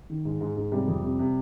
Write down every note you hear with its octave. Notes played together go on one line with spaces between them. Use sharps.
D#3
G#2
G#2
G#2
C3 G3
F2
C3
C3